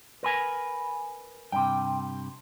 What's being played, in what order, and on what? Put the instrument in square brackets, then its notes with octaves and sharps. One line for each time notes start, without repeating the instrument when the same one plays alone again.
[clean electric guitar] A#4 B4 G#5
[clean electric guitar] G2 C3 [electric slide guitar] G5